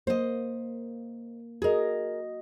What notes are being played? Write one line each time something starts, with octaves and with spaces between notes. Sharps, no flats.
A#3 C5 D#5
F#4 G#4 A#4 D#5